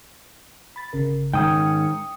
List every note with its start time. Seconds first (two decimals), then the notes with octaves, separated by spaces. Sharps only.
0.76 B5 A6
0.93 G1 C#3 A#4
1.33 G#2 D#3 C#4 G5 D#6
1.48 C#7